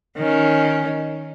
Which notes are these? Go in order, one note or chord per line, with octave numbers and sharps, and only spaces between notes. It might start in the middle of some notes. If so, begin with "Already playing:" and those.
D#3 C#4